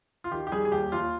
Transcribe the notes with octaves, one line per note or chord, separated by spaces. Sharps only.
F4
D#3 G4
G4
G3 G#4
G#4
D#2 G4
D#2 F4